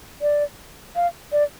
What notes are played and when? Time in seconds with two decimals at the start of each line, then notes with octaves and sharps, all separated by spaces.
0.22 D5
0.96 F5
1.32 D5